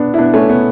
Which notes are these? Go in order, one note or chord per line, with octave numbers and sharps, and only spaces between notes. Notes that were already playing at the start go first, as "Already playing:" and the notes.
Already playing: B3 D4
E4
B3 D4
A3 C#4
B3